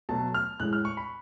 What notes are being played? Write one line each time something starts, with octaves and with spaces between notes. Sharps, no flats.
B2 F#3 A3 A5
F6
A2 G#3 F#6
F6
C#6
B5